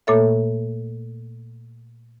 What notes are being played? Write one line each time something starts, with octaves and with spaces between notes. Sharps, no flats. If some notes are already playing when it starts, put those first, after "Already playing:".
A#2 A3 A#3 A4 C#5 E5